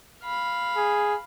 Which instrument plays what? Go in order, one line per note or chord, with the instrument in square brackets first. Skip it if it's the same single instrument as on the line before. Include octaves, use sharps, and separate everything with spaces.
[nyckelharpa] F5 B5
[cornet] G#4